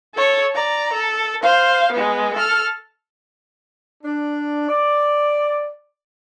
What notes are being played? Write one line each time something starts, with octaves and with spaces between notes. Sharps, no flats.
A4 C#5
D5 A#5
A4
C5 F5
G#3 B3
A4 F6
D4
D5